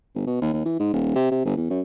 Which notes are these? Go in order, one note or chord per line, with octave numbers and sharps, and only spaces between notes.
G1
B2
D#2
D#2
E3
G#2
D#1
C3
C3
G1
E2
F#2